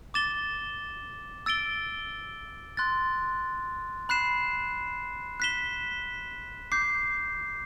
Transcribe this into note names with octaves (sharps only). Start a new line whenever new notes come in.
D6 A6 E7 G7
E6 A6 D7 G7
C6 F#6 A6
B5 F#6 C7 E7
F#6 B6 E7 G7
D6 G6 C7